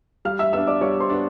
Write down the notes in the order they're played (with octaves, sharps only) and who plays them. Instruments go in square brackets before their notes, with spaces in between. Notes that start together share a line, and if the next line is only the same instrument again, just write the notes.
[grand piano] G3 [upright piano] F5 F6
[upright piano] E5 E6
[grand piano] B3 D4 [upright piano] E5 E6
[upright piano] D5 D6
[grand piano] G3 [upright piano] C#5 C#6
[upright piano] C5 C6
[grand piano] B3 D4